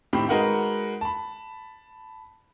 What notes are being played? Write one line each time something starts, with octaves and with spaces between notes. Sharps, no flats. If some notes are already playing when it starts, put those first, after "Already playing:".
A2 D#3 C4 G4 B5
G#3 D#4 F#4 A#4 B4 F#5
A5 B5